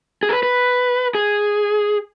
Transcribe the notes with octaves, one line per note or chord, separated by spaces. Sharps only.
G#4
A#4
B4
B4
G#4